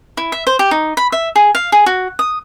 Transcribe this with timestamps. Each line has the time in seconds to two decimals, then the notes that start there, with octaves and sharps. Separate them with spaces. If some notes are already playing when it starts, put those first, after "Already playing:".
0.17 E4
0.32 E5
0.47 C5
0.59 G4
0.71 D#4
0.97 B5
1.12 E5
1.36 G#4
1.55 F5
1.72 G#4
1.86 F#4
2.19 D#6